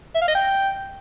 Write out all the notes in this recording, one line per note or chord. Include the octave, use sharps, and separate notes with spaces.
E5
F5
D#5
G5